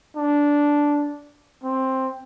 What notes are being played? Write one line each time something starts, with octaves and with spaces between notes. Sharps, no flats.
D4
C4